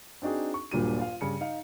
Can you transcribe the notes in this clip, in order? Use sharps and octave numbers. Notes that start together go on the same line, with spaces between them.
C4 D4 D#4 F#4 G#4
C#6
D#1 G2 A#2 F#3 D4 D#7
F4 F5
G2 C#3 C#7
D#4 F5